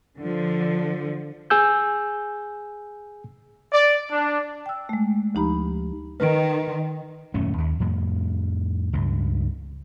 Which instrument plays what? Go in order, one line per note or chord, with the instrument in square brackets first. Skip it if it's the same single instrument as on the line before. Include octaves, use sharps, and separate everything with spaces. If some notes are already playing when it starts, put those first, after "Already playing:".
[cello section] D3 F3
[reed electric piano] G#4 G#5 E6 G6
[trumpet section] D5
D4
[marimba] G5 E6
G#3 A3
D2 F3 D#4 G4 A#5 B5
[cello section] D#3 [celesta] B4 D7
[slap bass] D#1 F#2 A3 C#4
D#2
F2 A2
C#2 G2